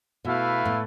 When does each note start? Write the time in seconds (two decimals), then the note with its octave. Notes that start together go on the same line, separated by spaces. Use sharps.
0.25 B2 A3 E4 B4 F5
0.65 A2